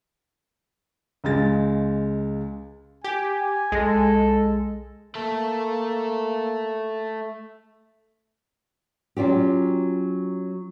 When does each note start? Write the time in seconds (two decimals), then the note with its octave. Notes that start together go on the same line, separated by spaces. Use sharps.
1.24 C#2 G#3 A6
3.04 G4 G#5
3.72 B1 G#3 A4 A#6
5.15 A3 A#3 A4
9.17 F#3 C#4 F4 G4